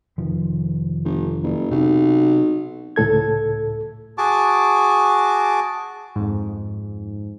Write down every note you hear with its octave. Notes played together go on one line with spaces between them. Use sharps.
F1 D#3 F3
G1
F#1
B1 C3
C#2 A2 A4 G#6
F#4 G#4 A5 D6
F2 G#2